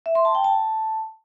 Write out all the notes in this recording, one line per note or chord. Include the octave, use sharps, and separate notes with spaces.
E5
C6
A5
G5
A5